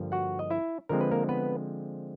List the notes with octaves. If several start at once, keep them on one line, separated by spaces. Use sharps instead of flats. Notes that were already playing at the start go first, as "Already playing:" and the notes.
Already playing: G2 D3 F3 A#3
F#4 F#5
D#5
E4 E5
D3 F3 G#3 C4 A#4
B4
A#3 A#4
B3 B4